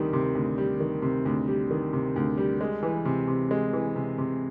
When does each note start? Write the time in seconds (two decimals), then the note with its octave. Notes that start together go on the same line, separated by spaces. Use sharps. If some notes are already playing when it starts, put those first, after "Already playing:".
Already playing: D2 C3 D#3 G3
0.13 C3
0.35 D2
0.58 G3
0.80 D#3
1.02 C3
1.25 D2
1.48 G3
1.71 D#3
1.93 C3
2.16 D2
2.37 G3
2.61 G#3
2.83 E3
3.05 C3
3.28 C3
3.51 G#3
3.73 E3
3.96 C3
4.18 C3